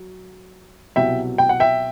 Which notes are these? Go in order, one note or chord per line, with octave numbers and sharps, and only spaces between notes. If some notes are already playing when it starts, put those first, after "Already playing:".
Already playing: F#3
C2 B2 F#3 E5 G5
G5
F#5
E5 G5